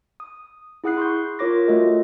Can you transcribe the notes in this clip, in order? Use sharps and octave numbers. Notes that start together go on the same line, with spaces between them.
D#6
E4 G#4 F#5 D#6 F#6 C7
C6 C#6 G6
F4 A#4 C#5 D6 A#6
A3 F4 F#4 A4 D#5